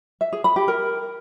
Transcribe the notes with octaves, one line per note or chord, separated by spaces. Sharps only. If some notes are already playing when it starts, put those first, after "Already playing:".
E5
G#4
B5
G4
A#4